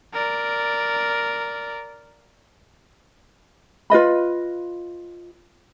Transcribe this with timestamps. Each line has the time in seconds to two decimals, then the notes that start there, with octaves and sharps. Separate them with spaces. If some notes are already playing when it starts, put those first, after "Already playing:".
0.14 A#4 D5
3.90 F4 B4 D#5 B5